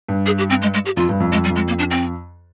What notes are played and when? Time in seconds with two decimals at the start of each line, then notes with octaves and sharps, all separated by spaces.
0.08 G2
0.26 G#4
0.38 G4
0.50 C4
0.62 G#3
0.74 G#3
0.85 G4
0.97 F2 F4
1.09 G2
1.20 F2
1.32 F2 G#3
1.44 G3
1.50 F2
1.56 G#3
1.68 A#3
1.79 D4
1.91 C4